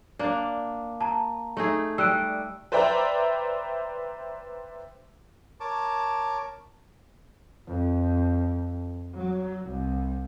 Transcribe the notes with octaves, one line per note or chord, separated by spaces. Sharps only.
A#3 D4
A5 A#5
A3 D#4 G#4
G3 E6 F#6 D7
B4 C5 D5 E5 G5 A#5
A#4 C#5 A5 D6
F2
F#3
C2